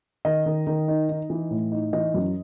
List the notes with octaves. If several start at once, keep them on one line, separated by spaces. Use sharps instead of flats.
D#3 D#5
D#3
D#3
D#4
D#4
E3
A2
D#4
E3 D#5
F#2